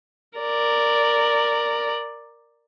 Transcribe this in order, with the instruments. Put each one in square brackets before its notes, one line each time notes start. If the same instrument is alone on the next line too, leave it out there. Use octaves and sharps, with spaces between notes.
[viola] A#4 D5